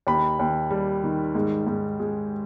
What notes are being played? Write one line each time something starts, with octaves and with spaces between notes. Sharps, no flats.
D#2 B5
D#2
G3
D#3
G#2
G#2
G#3